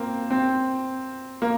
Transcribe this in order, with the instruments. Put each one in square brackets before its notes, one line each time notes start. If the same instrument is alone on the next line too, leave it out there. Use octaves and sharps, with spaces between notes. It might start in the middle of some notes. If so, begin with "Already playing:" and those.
Already playing: [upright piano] A#3 C4
C4
A#3